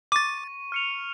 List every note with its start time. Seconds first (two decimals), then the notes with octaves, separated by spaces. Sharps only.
0.12 C#6 D6 A6 D#7
0.72 F6 C#7 F7